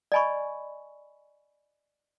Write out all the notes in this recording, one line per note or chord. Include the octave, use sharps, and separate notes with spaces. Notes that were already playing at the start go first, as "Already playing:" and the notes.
D5 D#5 G#5 B5 C#6